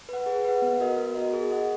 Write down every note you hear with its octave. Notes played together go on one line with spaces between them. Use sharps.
B4 F#5
G#4
B4 F#5
B3
F#4 A#4 D#5
B3
F#4 A#4 D#5
G#4
D#5 F#5